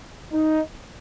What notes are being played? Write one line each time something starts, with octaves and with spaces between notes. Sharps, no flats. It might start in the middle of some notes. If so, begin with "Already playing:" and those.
D#4